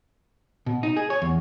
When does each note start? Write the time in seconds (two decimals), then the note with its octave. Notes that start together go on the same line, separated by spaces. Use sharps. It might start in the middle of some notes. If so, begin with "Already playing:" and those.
0.66 B2
0.83 D#4
0.97 G#4
1.10 C#5
1.22 E2